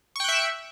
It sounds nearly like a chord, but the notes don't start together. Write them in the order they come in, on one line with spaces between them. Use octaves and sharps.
C#6 G5 F#6 E5